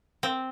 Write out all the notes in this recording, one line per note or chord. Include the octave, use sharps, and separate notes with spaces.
C4